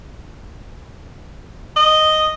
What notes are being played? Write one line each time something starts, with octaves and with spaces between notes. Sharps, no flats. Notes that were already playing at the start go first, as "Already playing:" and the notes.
D#5